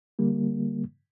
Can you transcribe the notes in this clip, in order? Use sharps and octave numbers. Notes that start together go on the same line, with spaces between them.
D3 G3 A#3